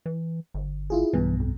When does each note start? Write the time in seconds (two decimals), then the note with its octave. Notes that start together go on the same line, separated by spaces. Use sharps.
0.06 E3
0.54 G1
0.90 E4 F4 G#4
1.13 B1 G2 B2 E3
1.40 F2